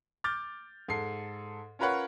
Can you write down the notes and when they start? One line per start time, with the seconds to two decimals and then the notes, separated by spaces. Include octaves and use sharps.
0.24 D6 F6 G6 A6
0.88 G#2 A4 C7
1.79 C#4 F4 A#4 B4 C#5 F#5